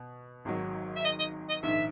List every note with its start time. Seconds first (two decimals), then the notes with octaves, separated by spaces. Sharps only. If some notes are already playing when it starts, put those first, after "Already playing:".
Already playing: B2
0.45 G#1 G#2 D#3 F#3
0.96 E5
1.05 D#5
1.19 D#5
1.49 D#5
1.63 A#1 G#2 D#3 E5